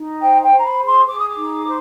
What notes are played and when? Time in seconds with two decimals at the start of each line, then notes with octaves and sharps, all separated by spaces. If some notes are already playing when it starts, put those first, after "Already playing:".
Already playing: D#4
0.21 C5 G5
0.43 G5
0.50 C5
0.58 A#5
0.64 B5
0.79 G#4
0.86 C6
1.08 G#4 D6
1.18 D#6
1.29 D6
1.37 D#4
1.65 C5